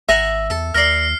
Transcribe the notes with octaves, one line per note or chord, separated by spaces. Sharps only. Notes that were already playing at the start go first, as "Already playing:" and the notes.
G#1 E5 F#5 G#5 A#5
E2 A4
D#2 A#4 D5 F6 C7